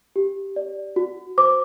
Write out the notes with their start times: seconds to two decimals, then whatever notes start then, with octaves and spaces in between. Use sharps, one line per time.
0.16 G4
0.56 D5
0.96 F#4
1.38 C5 D6